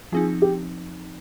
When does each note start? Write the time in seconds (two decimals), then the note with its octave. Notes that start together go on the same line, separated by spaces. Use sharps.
0.12 F3 C4 D#4 F4 G#4
0.42 G4